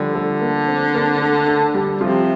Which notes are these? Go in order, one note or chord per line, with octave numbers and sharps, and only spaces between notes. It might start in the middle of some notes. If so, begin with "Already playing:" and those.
Already playing: D3 F3 G3 G4
A3 A4
A#3 A#4
C4 C5
A#3 A#4
A3 A4
A3 A4
G3 G4
C3 F3 F4